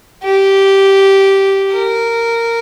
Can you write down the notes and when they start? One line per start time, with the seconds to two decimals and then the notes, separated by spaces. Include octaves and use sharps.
0.23 G4
1.73 A#4